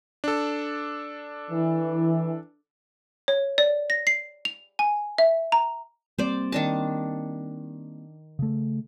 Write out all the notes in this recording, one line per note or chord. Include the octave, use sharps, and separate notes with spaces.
D4 A4
E3
C#5
D5
A#6
C7
F7
G#5
E5
A#5
G3 A#3 C4 C5 D5
D#3 D4 A5
C#3 A3